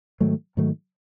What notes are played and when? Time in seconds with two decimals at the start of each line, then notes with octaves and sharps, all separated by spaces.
0.20 G#2 D#3 F#3 A3
0.57 G#2 D#3 F#3 A3